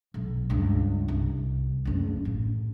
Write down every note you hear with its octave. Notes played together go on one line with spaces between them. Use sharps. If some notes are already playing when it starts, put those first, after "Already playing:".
B1
C#2 G2
C2
F#1 D2
A1